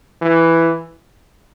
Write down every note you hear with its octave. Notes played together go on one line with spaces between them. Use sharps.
E3